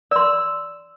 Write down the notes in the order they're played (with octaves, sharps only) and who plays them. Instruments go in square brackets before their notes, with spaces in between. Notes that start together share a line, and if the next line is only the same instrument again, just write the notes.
[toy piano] D5 C6 [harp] E6